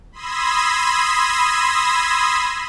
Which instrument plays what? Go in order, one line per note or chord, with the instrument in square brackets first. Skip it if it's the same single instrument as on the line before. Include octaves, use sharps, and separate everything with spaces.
[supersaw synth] B5 C6 D#6 E6 G#6 A#6